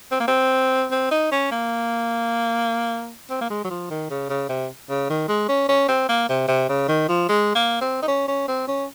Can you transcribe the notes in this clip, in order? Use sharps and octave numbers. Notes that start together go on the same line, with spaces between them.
C4
A#3
C4
C4
D#4
C#4
A#3
C4
A#3
G#3
F#3
F3
D#3
C#3
C#3
C3
C#3
D#3
G#3
C#4
C#4
C4
A#3
C3
C3
C#3
D#3
F3
G#3
A#3
C4
D#4
C#4
C#4
C4
C#4